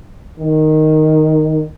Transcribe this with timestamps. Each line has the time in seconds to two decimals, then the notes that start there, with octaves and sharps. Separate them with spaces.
0.39 D#3